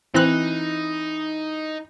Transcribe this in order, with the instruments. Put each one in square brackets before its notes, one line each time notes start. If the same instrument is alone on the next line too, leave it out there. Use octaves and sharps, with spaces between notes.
[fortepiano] E3 [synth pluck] C4 F#6 [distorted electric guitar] D#4